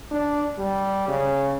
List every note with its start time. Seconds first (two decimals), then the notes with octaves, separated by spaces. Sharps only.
0.11 D4
0.59 G3
1.08 C#3